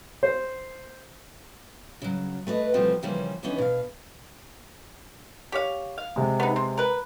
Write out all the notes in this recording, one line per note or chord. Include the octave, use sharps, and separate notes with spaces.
C5
C#3 F#3
A3 B4 C#5 D#5
B2 E3 F3 G3 A3 C4
C#3 E3 F3 G3 A#3 C#4
D3 E3 B3 C#4 D#4
B2 F5
G4 C#5 F5
F5
C3 G#3
B3 D#4
C4
A#4 B4